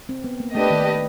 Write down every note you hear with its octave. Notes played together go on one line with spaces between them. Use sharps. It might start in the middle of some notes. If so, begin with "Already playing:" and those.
C4
B3
A#3
A3 D4 G4 B4 D#5
D#3